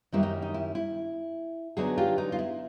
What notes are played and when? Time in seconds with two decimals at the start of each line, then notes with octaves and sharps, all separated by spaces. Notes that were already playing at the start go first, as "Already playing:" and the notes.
0.12 F#2 D#3 G3 A#3 D#4 E4
0.23 D#4
0.42 D#4
0.54 E4
0.75 E4
1.77 D3 F#3 B3 D#4 F#4 G#4
1.98 F4 G4
2.18 D#4
2.32 F4
2.39 E4